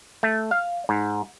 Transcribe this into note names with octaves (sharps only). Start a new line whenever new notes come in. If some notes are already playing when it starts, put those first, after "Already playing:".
A3
F5
G#2